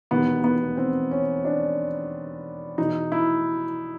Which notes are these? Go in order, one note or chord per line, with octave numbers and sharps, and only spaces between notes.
E1 D#2 D#3 B3
B3
C4
C#4
D4
E2 B2 D#4
E4